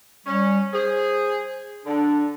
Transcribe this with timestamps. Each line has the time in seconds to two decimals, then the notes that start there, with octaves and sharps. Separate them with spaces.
0.26 G3 C#4
0.73 G#4 C5
1.85 D3 D4